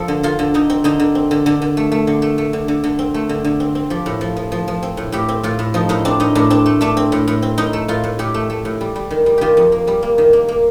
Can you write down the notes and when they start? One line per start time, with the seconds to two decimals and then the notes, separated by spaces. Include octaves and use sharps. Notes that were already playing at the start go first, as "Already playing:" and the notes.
Already playing: F3 A4
0.08 D3
0.23 D3 F4
0.39 D3
0.54 D3 D#4
0.70 C4
0.84 D3 D#4
1.00 D3
1.15 C4
1.31 D3
1.46 D3
1.62 D3
1.77 A3
1.92 A3
2.07 D3
2.22 A3
2.38 A3
2.53 D3
2.68 D3
2.84 D3
2.99 C4
3.14 A3
3.29 D3
3.44 D3
3.60 C4
3.75 C4
3.90 F3 G4
4.06 A2
4.21 F3
4.36 F3
4.52 F3
4.68 F3
4.83 C4
4.97 A2
5.12 A2 G4
5.28 C4
5.43 A2 F4
5.59 A2
5.74 F3 D#4
5.89 A2 D#4
6.05 C4 D4
6.20 A2 D#4
6.35 A2 D4
6.50 C4 D4
6.66 A3
6.81 A3 D4
6.97 C4
7.12 A2
7.28 A2
7.42 C4
7.58 A2 D#4
7.73 A3
7.88 A2 F4
8.04 A2
8.19 A2 G4
8.34 A3
8.50 A3
8.65 A2
8.81 G3
8.96 G3
9.11 D#3
9.26 G3
9.38 D#3 F4 G4
9.57 F2
9.72 A#3
9.87 G3
10.03 A#3
10.18 D#3
10.33 A#3
10.48 A#3